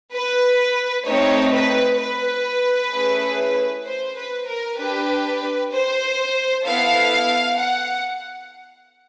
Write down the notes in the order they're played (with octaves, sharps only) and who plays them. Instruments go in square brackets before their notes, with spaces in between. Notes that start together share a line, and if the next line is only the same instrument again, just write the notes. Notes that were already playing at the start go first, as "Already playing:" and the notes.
[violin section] B4
A3 C4 D#4 C#5
B4
B4
A3 C#4 E4 G#4
C5
B4
A#4
D4 G4 B4
C5
B3 E4 A4 F5
F#5